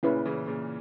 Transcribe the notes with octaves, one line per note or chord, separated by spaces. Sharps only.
A#2 C#3 C#4 E4 B4
C#3 E3
A#2 C#3